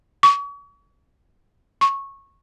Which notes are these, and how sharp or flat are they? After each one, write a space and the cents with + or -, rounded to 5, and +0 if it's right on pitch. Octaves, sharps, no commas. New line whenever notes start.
C#6 +35
C#6 -15